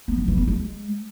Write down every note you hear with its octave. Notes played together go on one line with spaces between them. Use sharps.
B3
D#3
E3
B3
G#3